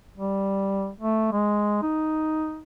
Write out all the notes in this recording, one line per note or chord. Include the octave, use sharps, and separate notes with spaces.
G3
A3
G#3
D#4